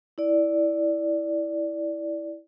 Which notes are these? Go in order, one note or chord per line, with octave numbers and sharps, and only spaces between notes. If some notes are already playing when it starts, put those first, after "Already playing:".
E4 D5